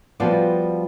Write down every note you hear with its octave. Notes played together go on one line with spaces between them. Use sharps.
F3 G3 B3 F4 F#4 D5